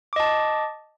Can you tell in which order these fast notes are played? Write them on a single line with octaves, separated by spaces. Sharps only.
D6 D#5 A5